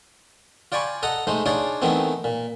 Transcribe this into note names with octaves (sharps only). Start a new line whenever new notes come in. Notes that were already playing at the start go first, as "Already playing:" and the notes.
F4 D5 G5 G#5 B5 C#6
A4 D#5 F#5 A#5
G#3 A3 D#4 C5
D4 D#4 F4 G#4 C#5 D5
D#3 E3 A3 B3 C4 D#4
A#2